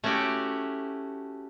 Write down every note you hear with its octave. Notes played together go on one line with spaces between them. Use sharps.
A3 C#4 E4 F#4 G4